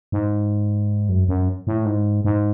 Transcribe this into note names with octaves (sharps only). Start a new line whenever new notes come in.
G#2
F#2
F#2
A2
G#2
G#2